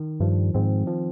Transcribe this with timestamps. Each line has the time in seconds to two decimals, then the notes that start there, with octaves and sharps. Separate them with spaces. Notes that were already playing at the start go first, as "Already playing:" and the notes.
Already playing: D#3
0.20 G2 F3
0.54 G#2 C4
0.87 F3